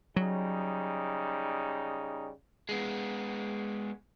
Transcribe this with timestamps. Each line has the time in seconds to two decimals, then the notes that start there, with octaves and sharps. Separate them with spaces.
0.16 C#3 F#3 G3 D#4
2.69 G#3 B3